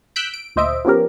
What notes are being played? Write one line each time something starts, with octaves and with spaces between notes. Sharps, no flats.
E6 F#6 G6 B6 D7
D7
D2 A#2 C5 D#5 E5 D7
F3 B3 C#4 G4 A#4